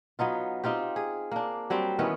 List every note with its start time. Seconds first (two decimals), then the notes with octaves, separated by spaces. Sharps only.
0.19 F#3 B3 D#4 F4
0.64 C4 D#4 F4 G4
0.96 G#4
1.31 A#3 D4
1.70 F#3 G3 C4
1.99 D#3 E3 B3 C#4